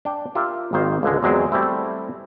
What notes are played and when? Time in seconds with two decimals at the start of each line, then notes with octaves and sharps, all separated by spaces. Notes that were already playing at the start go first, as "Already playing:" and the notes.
0.05 D4 G5
0.35 F4 G4 A#4 E5
0.73 G#1 D#3 A#3 C5
1.03 C#2 D3 G#3
1.23 E2 F#3 G#3 C4
1.52 G3 A3 C4 E4